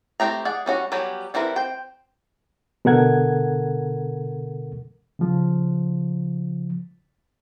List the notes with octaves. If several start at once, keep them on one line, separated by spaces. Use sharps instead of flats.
A3 C4 G4 A#5
G#4 D5 F#5
G3 C#4 F#4
F#3 G3 B3 G4 G#5
G3 C4 E4 A#4 B4
C4 G5
B2 D3 A4 A#4 F#5 G#6
C#3 F3